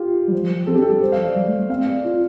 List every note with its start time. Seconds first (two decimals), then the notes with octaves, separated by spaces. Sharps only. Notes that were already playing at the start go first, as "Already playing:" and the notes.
Already playing: F4 G4
0.28 G3
0.32 F3
0.44 F3
0.56 F3
0.67 C4 A4
0.74 G4
0.78 D4
0.82 A4
0.91 G3
1.01 F3 C5
1.12 F5
1.25 F3 D5
1.35 G3
1.47 A3
1.59 A3
1.69 C4 F5
1.87 D5
2.04 F4